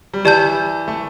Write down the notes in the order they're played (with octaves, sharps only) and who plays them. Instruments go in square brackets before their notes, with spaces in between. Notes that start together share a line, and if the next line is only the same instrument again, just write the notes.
[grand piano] G3
[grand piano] E3 [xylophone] G4 D5 A5 G6
[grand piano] A3